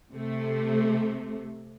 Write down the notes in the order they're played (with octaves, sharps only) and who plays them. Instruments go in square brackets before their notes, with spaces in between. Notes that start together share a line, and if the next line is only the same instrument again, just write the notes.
[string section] C3 A3